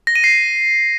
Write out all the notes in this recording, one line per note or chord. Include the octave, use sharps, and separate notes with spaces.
A#6
D#7
C7